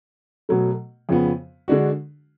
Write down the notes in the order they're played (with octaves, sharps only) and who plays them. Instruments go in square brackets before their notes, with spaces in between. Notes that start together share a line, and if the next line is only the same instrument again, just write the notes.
[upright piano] B2 F#3 A3
F2 C#3 F3 B3
D3 G#3 D4 F#4